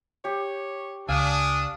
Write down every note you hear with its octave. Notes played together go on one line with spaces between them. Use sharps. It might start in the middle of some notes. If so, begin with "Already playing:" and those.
G4 C#5
C#2 D4 F5 G#5 D#6